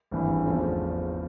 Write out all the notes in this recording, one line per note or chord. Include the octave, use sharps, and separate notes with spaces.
G#1 G2 E3
E2 C#3 F3 A3